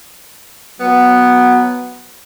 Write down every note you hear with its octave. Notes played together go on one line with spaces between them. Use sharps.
F#3 B3